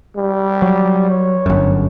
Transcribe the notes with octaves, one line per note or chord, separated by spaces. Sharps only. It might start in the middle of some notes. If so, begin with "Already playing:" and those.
G3
F#3
C#5
G1 F#2